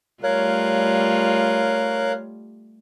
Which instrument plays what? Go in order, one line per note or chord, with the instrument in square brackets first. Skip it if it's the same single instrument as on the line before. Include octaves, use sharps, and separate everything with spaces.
[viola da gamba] G3 A3 F4 [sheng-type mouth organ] A#4 F5 F#6 [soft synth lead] C#5